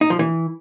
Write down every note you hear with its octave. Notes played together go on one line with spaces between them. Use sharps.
D#4
F3
E3